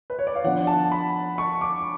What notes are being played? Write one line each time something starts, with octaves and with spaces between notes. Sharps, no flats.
B4
C#5
D5
F5
F3 B3 D4 F#5
A5
B5
C#6
D6